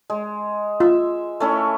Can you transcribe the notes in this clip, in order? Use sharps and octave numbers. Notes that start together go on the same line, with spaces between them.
G#3
F4 E5
A3 C#4 E4